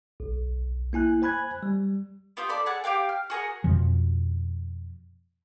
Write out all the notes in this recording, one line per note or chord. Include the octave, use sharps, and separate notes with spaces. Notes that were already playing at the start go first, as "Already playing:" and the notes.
B1
A#3 E4 G#5 F#6
C5 G#5 B5 F#6 G#6
G3
B3 F4 G4 C5
A4 D5 B5
G#4 A4 F#5 A5
G4 C5 F5 G5
F6
F#4 G#4 A#4 F#5
F2 B2 F3